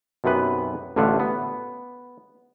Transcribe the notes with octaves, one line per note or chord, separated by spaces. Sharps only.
B1 F#2 C3 B3 B4
A1 A2 D3 F4 E5 F#5
B3